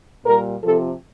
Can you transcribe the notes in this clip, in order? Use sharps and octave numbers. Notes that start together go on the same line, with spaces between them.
A#2 G3 A#4
C3 F3 A4